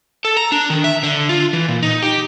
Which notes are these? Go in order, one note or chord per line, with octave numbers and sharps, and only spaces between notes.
A4
A#5
D4
D#3
E5
D3
F4
E3
A#2
D#4
G4